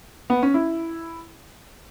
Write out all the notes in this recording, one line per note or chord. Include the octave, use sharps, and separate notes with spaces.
B3
C#4
E4